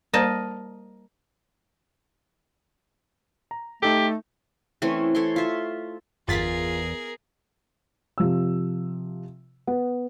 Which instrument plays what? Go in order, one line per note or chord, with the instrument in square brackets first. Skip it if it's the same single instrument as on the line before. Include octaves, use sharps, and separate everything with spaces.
[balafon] G3 A#3 C5 [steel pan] A#4 [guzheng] D#5 A5
[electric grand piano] A#5
[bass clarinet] A3 [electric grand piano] D#4 A4 [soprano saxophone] G4
[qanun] E3 A3 C4 C#4
E4 A4 C#5 C6
F4 E5
[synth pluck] G1 A6 B6 [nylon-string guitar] E2 [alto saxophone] F4 [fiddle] G#4 A#4
[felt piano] C3 F3 E6
B3